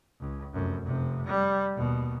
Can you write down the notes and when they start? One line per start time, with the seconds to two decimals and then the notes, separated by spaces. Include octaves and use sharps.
0.20 C#2
0.54 F1 F#2
0.85 F1 C3
1.27 G3
1.75 D#2 B2